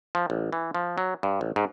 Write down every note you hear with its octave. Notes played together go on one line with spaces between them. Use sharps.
F3
A1
E3
F3
F#3
G2
A1
G#2